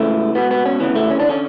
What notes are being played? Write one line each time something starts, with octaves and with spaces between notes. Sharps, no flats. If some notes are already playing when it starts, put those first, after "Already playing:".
Already playing: C#2 C#3 E3 A3
C#2 B2 B3
B3
C#4
D2 C#3 E3 B3
A3
C#4
D4
D3 C#4